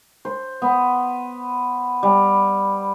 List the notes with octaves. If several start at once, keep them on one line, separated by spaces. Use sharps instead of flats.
C5
B3
G3